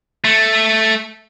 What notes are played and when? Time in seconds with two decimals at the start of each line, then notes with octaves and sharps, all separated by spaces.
0.24 A3